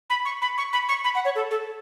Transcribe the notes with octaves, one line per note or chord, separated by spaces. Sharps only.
B5
C#6
B5
C#6
B5
C#6
B5
F#5
C#5
A4
A4